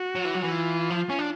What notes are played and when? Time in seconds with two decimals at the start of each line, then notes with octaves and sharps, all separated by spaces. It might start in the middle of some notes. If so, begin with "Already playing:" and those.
Already playing: F#4
0.15 F#3
0.25 E3
0.34 F#3
0.43 E3
0.53 F4
0.90 F3
1.09 C#4
1.19 D4